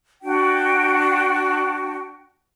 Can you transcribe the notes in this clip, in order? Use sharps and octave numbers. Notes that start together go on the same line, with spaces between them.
D4 F#4 G5